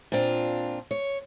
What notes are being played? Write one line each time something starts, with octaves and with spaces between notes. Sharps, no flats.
A#2 C4 D4 F4
C#5